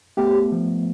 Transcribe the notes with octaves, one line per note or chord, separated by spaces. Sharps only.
A3 B3 G4
F3